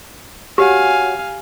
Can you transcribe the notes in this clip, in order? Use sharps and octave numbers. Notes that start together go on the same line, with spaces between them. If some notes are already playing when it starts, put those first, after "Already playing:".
F#4 G4 C#5 F5 F#5 G#5